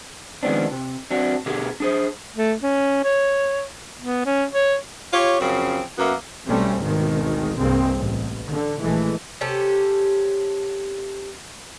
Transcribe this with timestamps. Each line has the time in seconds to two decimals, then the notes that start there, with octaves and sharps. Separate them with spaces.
0.43 D#3 F3 G#3 B3 C4 D4
0.72 C3
1.11 F#3 C4 D4 F#4
1.46 B2 D3 G4 G#4 A#4
1.80 D4 G#4 C5
2.35 A3
2.63 C#4
3.04 C#5
4.02 B3
4.26 C#4
4.53 C#5
5.13 F4 G4 C#5
5.40 F#2 C#3 F3 C4
5.99 F#2 A#3 B3 E5
6.46 B1 G3 A3 C4 C#4
6.80 G#1 D2 G#2 B2 D#3
7.58 C2 G2 G#3 A#3 C4
7.98 A1
8.48 D3
8.81 A#1 E3 G#3 A3
9.41 C3 C#4 G4 A4